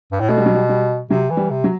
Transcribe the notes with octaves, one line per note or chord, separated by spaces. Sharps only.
G2
A2
B2 A3
G3
F#3
G3
G3
C3 F#3
E3
G3
C3
F#3